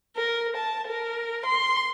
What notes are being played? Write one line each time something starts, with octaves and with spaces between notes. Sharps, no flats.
A#4
A5
A#4
C6